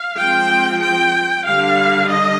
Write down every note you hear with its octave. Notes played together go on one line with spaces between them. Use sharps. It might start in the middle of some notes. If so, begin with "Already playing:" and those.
Already playing: F5
F3 G#3 C4 G5
G5
D3 G3 D4 F5
D#5